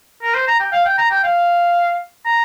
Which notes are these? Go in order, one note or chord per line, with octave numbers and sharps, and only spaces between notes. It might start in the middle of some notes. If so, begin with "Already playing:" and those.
A#4
C5
A#5
G5
F5
G5
A#5
G5
F5
A#5